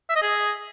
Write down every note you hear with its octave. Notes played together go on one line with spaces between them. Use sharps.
E5
D#5
G#4